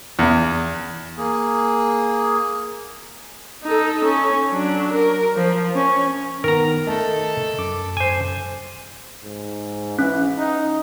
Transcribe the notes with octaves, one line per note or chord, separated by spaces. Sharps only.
E2
A#3 G#4
D#4 A4
C#4
F#3 D4
A#4
F3
C#4
D#3 B3 A#4 A#5
A3 A4 D#5
F#2 D6
C5 G#5
G#2
E3 C#4
D#4